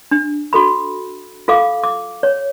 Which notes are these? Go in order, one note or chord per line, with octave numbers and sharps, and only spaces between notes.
D4
F#4 A4 B5
F4 A4 F5 D6
D6
C#5